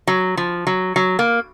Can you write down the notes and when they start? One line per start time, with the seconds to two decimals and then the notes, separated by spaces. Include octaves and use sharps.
0.07 F#3
0.37 F3
0.67 F#3
0.96 F#3
1.19 A#3